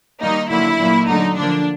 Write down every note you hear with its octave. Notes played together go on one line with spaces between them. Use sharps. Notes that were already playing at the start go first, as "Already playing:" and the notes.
D#3 G3 A#3 D#4
D3 F#3 A#3 E4
A#2 F#3 A#3
D3 F#3 A3 D#4
D3 F3 A#3 D4